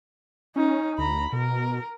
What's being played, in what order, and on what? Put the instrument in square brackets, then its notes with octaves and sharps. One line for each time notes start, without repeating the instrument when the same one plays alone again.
[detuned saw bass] C#4 [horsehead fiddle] D#4
[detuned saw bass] D2 [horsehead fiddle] A#5 B5
[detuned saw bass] B2 [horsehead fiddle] A#4